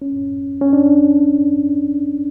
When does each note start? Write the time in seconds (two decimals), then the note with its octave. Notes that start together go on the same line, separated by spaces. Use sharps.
0.02 C#4
0.61 C#4
0.73 D4